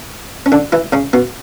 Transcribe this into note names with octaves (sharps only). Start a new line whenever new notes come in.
C#4
D3 D4
E3 E4
C#3 C#4
B2 B3